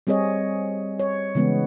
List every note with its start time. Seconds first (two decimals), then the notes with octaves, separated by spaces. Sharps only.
0.07 G3 C4 G#4 C#5 D#5
0.99 C#5
1.35 C#3 E3 G#3 B3 C#4